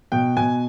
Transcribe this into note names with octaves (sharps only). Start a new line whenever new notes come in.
B2 G5
B2 G#5